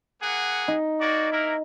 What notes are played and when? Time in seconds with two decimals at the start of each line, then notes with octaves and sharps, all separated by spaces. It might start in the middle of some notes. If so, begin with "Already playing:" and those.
0.22 A#3 G#4 F#5
0.68 D#4
1.01 A#3 F#4 D5
1.32 A#3 E4 A#4